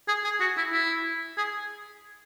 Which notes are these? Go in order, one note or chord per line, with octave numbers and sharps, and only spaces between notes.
G#4
G#4
F#4
E4
E4
G#4